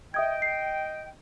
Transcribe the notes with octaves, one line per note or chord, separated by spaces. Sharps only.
D#5 E5 G5 D#6 G#6
C7